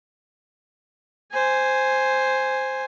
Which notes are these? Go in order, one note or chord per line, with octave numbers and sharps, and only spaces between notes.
C5 G#5